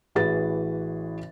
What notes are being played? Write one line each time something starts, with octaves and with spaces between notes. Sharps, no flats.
A1 E3 F#4 G#4 B4 A6